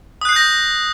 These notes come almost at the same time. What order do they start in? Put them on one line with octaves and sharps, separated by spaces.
D#6 F#6 C7 G6 A#6